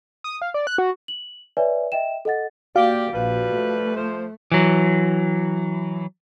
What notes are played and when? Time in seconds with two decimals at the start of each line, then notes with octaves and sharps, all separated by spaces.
0.24 D#6
0.42 F5
0.54 D5
0.67 F#6
0.78 F#4
1.08 F#7
1.57 B4 C#5 D5 E5 G#5
1.92 D#5 E5 G5 E7
2.25 A4 D#5 F#5 A6
2.76 A#3 F#4 G4 D5 F5
3.13 A#1 F3 G3 B4
3.53 A3
3.96 F3 C5
4.52 E3 F#3